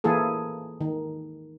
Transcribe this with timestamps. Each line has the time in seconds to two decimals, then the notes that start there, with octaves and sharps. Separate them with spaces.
0.04 E3 A#3 E4 G#4 A4
0.81 D#3